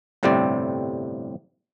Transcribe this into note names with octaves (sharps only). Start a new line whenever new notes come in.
G1 A2 C3 G3 C4 D5